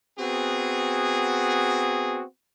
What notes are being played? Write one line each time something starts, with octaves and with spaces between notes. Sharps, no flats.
B3 C4 F#4 G#4